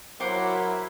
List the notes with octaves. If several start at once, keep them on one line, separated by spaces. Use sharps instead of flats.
F#3 E4 A#4 C5 F#5 D6